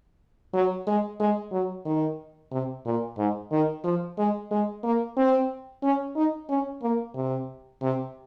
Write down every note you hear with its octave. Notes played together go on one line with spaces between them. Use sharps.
F#3
G#3
G#3
F#3
D#3
C3
A#2
G#2
D#3
F3
G#3
G#3
A#3
C4
C#4
D#4
C#4
A#3
C3
C3